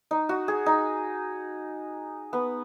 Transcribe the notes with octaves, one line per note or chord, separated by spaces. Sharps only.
D#4
F#4
G#4
D#4
B3